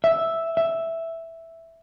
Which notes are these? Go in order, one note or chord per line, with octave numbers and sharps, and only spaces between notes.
E5
E5